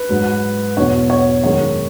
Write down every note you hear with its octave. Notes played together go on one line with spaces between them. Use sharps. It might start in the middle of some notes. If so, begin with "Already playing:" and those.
Already playing: B4
G#2 F#3
E2 B2 F#3 C#5
C#5
F#2 D#3 G#3 C#5